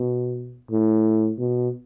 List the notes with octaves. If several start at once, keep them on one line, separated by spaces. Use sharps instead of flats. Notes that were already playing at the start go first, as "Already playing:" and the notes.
Already playing: B2
A2
B2